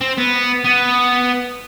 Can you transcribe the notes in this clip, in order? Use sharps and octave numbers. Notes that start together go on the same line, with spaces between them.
C4
B3
B3